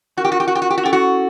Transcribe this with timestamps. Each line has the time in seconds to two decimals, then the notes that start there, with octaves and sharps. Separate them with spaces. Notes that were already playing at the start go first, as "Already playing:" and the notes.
0.17 C#4 F4 F#4 A#4
0.25 G4
0.32 F#4
0.40 G4
0.48 F#4
0.55 G4
0.62 F#4
0.70 G4
0.78 F#4
0.83 C#4 E4 G4 A4
0.93 F#4